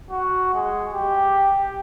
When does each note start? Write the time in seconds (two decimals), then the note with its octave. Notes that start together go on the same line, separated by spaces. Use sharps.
0.10 F#4
0.54 G#3
0.93 G4